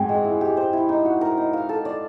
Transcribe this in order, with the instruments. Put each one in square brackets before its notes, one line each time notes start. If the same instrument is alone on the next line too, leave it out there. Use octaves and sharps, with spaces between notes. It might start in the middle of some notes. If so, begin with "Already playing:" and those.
Already playing: [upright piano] G#2 [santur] C4 F#4 G#4
[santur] G#3
E4
G4
C5
E4
D#4
F#4
A#4
D#4
F5
A4
D5